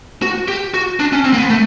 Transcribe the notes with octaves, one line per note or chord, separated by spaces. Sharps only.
F#4
G4
F#4
D4
C#4
C4
A#3
B3
A3